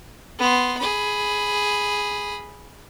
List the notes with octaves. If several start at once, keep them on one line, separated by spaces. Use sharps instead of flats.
B3 C6
G#4 B5